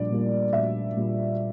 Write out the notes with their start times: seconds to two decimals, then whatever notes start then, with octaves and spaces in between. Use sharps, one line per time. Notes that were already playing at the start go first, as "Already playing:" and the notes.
Already playing: A#1 A#2 G3 D5
0.10 A#2 G3 A#3
0.53 A#1 E5
0.96 A#2 G3 A#3